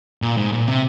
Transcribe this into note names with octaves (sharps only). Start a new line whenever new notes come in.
A#2
G#2
A#2
C3